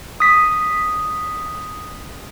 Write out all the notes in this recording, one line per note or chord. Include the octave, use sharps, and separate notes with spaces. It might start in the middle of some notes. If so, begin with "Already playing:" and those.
D#6 B6